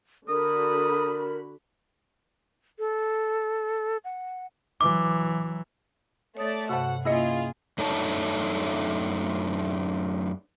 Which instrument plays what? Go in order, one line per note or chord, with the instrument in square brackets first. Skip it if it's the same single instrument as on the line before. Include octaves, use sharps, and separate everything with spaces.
[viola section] D3 F#4 B5 [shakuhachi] A#4 [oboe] D#6
[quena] A4
F#5
[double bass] E3 F#3 [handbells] D6
[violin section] A3 D5 [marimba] C#5 D#6 A6
[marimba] G2 C3 [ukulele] F#4 C5 A5 [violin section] F#5
[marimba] C3 A#3 C#4 [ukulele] E4 D#5 [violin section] F4 G#4
[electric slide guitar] F#2 A3 D4 D#4 C#5 A5